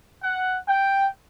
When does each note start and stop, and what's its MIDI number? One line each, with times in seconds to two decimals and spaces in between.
0.22 0.57 78
0.68 1.07 79